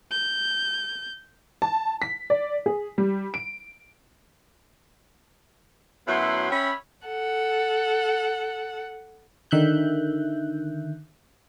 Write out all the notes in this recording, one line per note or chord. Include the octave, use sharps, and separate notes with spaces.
G6
A5
B6
D5
G#4
G3
D7
F#2 F#3 A3 B3 E4 C6
C#4 C#5 E5 G5 B5
A4 F#5
D3 D#3 E5 F#6 G6